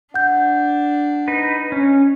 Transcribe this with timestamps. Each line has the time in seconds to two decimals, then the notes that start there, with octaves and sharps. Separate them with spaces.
0.14 D4 F#5 G6
1.28 D#4 B4
1.72 C#4